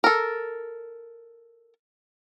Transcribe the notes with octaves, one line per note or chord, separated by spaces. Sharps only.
A4 A#4